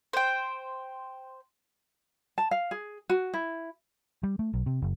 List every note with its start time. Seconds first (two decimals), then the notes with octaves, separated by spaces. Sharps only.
0.13 C5 G5
2.38 A5
2.51 F5
2.71 G#4
3.10 F#4
3.34 E4
4.23 G3
4.39 A3
4.54 B1
4.66 C3
4.82 F#1